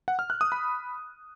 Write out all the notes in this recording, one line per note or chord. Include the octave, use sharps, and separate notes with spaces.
F#5
F6
F#6
D#6
B5